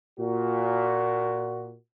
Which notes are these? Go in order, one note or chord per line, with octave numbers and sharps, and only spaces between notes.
A#2 F#4